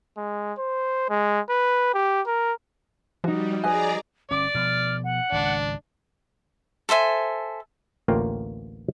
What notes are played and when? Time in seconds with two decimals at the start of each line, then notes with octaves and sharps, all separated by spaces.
0.17 G#3
0.58 C5
1.09 G#3
1.50 B4
1.94 G4
2.27 A#4
3.24 F3 G3 D#4 F#4
3.63 G#4 B4 D5 D#5 G#5 A#5
4.31 G1 C#4 D5 D6
4.55 B2 F3 F6
5.04 F#5
5.32 G#1 C#2 D4
6.89 A4 C5 E5 G#5
8.08 A1 D2 A#3 F4 A#4 G5